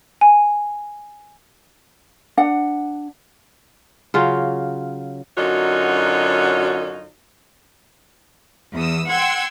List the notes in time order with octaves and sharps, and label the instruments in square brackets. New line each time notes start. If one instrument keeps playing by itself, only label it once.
[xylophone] G#5
[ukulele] D4 F#5
[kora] C#3 F#3 F4
[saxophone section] F#2 D3 D#4 F4 F#4 C#5
[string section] E2 D#6 E6
F#5 G5 C6 E6 G#6